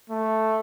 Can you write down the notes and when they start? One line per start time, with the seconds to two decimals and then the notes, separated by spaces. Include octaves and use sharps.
0.10 A3